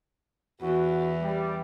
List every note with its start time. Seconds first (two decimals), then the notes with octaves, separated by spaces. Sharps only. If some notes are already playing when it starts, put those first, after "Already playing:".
0.61 E2 F#4
1.21 G3